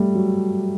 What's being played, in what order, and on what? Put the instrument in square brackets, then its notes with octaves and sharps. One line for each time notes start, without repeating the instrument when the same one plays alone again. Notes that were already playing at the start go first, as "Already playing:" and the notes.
Already playing: [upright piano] G3 A3
F#3